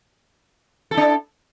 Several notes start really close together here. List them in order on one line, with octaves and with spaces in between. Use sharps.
A4 E4 D4